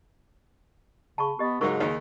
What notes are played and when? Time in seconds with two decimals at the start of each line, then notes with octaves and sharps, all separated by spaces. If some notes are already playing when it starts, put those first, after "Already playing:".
1.18 C#3 A5 B5 C#6
1.39 B3 G4 D#5
1.61 G#2 C#3 F#3 D#4 A#4 C#6
1.80 D#2 D#4 C#5